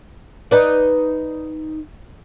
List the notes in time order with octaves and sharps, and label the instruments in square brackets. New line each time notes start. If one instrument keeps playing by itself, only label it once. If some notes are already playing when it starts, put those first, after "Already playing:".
[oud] D#4 B4 D5